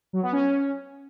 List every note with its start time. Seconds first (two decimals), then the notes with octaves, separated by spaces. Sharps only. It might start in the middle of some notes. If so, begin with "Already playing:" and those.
0.13 F#3
0.23 B3
0.32 C#4